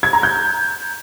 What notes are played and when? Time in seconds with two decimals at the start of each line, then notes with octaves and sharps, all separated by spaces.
0.03 G#6
0.13 A#5
0.23 G6